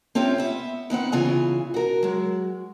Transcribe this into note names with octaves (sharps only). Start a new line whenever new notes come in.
C4 C#4 F4 G4 E5
B3 E5
D#3 B3 C4 F#5
C#3 E3 F4 G#5
F#4 A#4
F#3 G#3